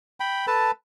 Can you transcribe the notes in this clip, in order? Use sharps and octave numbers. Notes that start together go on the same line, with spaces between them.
G5 B5
A4 B4 A5